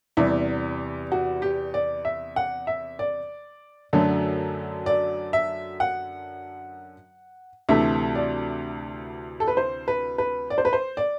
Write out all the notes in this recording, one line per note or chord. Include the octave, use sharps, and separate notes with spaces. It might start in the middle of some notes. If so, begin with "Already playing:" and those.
E2 C3 G3 E4
F#4
G4
D5
E5
F#5
E5
D5
F#2 D3 F#3 A3
D5
E5
F#5
D2 C3 E3 A3 E5
D5
A4
B4
C5
B4
B4
D5
C5
B4
C5
D5